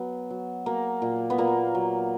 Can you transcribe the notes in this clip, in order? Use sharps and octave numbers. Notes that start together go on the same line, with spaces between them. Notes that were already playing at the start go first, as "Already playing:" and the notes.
Already playing: F#3 B3
F#3
F#3 A#3
A#2
B3
A#2 A#3
F#3